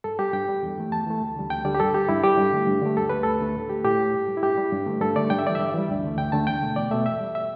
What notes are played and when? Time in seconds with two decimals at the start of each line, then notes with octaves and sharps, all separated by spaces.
0.04 G2 A4
0.19 G3 G4
0.33 G2 G5
0.48 G3
0.63 E2
0.78 E3 A3
0.92 E2 A5
1.07 E3 A3
1.21 D2
1.36 D3 G3
1.50 D2 G5
1.65 D3 G3 D5
1.75 G4
1.80 G2 A4
1.94 G3 G4
2.09 G2 E4
2.24 G3 G4
2.38 G2
2.53 D3 A3
2.67 G2
2.82 D3 A3
2.96 D2 A4
3.09 D3 A3 B4
3.23 D2 A4
3.40 D3 A3
3.55 A2
3.69 A3 G4
3.84 A2 G4
3.99 A3
4.14 G2
4.28 G3
4.37 E4
4.43 G2 G4
4.57 G3
4.72 G2
4.86 D3 A3
5.01 G2 A4
5.16 D3 A3 D5
5.30 G2 G5
5.39 E5
5.45 E3 G3 D5
5.55 G2 E5
5.74 E3 G3
5.89 D2
6.03 D3 A3
6.18 D2 G5
6.32 D3 A3 A5
6.47 E2 G5
6.62 B2 A3
6.76 E2 D5
6.91 B2 A3 E5
7.06 G2 E5
7.20 G3
7.35 E5